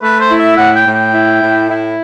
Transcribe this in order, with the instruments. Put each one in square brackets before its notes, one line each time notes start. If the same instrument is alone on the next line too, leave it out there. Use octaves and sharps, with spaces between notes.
[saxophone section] A3 [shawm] B4
[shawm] C5
[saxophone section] E4
[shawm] E5
[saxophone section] A2 [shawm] F#5
[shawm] G5
[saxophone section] A2
[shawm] G5
[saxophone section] E4
A2
E4